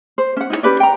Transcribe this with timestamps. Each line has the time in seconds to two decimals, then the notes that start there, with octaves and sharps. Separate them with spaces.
0.18 C5
0.37 C#4 F#5
0.50 D#4 E4 G4 C#5
0.63 C#4 G4 B4 D5
0.80 G5 A#5